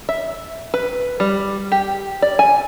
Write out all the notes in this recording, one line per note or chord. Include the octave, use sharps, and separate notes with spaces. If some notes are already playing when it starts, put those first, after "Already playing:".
E5
B4
G3
G4
D5
G#5